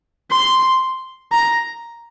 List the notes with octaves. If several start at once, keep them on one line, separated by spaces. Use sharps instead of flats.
C6
A#5